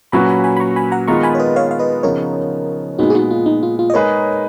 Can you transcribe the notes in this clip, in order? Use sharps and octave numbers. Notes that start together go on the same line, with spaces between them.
A#2 F#3 C#4 F#4 B4 G#5 B5
G#5 B5
G#5 B5
B5
A#5 C#6
G#5 B5
F#5 A#5
D#3 G#3 B3 F4 A#4 A#5 C#6
G#5 B5
C#5
B4 D#5
C#5 F5
F5
B4 D#5
C#3 F3 B3 D#4 A#4 C#5
A#2 G#3 B3 D#4 F#4
G#4
D#4 F#4
F4
D#4
F4
F4
D#5
G#3 D#4 G#4 A#4 B4 C#5